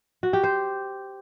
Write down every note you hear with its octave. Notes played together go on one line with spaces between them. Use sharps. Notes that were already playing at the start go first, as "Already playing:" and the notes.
F#4
G4
C5